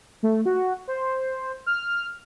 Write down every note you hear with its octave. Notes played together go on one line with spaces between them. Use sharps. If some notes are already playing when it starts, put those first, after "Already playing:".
A3
F#4
C5
F6